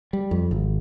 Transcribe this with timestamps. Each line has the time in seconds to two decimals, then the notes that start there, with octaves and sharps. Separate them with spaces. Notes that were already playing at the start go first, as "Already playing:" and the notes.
0.13 G3
0.31 F2
0.51 G#1